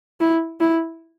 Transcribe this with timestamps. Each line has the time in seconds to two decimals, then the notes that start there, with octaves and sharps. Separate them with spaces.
0.20 E4
0.60 E4